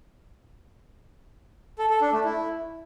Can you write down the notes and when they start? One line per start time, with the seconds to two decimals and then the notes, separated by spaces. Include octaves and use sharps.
1.79 A4
1.90 A4
2.01 D4
2.13 A3
2.24 E4